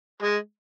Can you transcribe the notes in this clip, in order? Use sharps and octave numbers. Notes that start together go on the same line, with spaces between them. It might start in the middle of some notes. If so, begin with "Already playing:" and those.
G#3